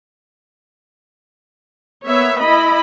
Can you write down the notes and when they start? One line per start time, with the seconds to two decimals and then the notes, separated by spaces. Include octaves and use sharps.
2.06 A#3 B3 C#5 E5
2.40 E4 D#5 B5